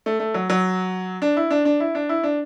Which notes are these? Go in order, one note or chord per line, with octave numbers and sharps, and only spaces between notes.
A3
A3
F#3
F#3
D4
E4
D4
D4
E4
D4
E4
D4